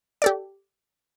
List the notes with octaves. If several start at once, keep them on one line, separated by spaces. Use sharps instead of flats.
G4 A4 D5